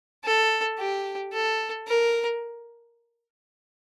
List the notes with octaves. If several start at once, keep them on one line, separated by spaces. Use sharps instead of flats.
A4
G4
A4
A#4